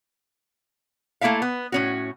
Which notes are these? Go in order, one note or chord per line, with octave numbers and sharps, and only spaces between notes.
A3 A#3 E4 E5 F5
B3
A2 C#4 F#4